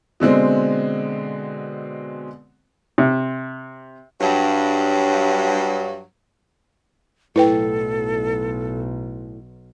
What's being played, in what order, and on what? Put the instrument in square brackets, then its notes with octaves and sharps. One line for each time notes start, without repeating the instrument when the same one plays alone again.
[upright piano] B2 D3 G#3 C4
[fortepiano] C3
[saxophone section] G2 F#3
[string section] B1 [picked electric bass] A2 [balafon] E4 B4 G5 [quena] A4